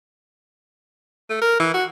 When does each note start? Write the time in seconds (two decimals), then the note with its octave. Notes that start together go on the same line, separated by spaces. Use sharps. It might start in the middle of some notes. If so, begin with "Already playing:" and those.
1.30 A3
1.42 A#4
1.60 E3
1.74 F#4